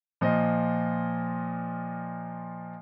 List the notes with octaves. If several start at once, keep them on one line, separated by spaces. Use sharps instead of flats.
A#2 F3 D#5